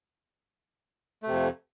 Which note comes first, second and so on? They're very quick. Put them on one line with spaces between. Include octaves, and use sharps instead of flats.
A3 C3 F2